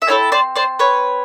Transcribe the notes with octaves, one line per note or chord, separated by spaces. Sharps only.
E5
C4 E4 A4 C#5 D#5
C5 D5
C5 D5
B4 C#5